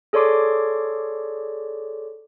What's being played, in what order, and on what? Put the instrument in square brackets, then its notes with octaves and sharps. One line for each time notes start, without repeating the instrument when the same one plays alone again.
[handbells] G#4 A4 C#5 D5 C6 D6